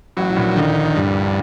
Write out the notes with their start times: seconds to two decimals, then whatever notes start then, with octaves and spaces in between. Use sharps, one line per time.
0.17 A1 A2 F#3
0.29 A2
0.36 A#1 A#2
0.56 D2 D3 D#3
0.96 G2